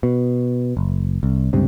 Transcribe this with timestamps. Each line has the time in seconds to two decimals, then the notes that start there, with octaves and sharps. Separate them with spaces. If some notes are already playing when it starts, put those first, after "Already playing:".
0.03 B2
0.77 F#1
1.23 C2
1.53 C#2 G2 C3